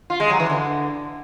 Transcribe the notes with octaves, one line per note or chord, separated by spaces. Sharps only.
F4
G#3
F#3
E3
D3